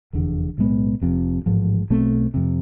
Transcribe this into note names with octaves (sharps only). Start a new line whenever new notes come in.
F1 E2 D3
B1 A2 G#3 B3
F1 F2 C3
A1 G#2 F3
B1 B2 A3 C4
F2 C3